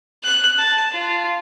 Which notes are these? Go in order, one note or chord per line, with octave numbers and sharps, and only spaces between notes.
F#6
A5
F4